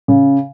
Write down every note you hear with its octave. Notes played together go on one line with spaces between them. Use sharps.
C#3